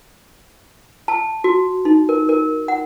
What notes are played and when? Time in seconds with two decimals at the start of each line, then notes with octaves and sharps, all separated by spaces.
1.08 A5
1.44 F#4
1.85 D#4
2.09 A#4
2.29 A#4
2.68 F#5